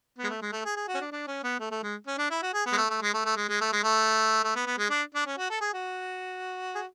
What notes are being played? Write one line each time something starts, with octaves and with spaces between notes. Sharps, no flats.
B3
G#3
A3
G#3
A3
G#4
G#4
F#4
C#4
D4
D4
C#4
B3
A3
A3
G#3
C#4
D4
E4
F#4
G#4
B3
G#3
A3
A3
G#3
A3
A3
G#3
G#3
A3
G#3
A3
A3
B3
B3
G#3
D4
D4
C#4
F#4
A4
G#4
F#4
G#4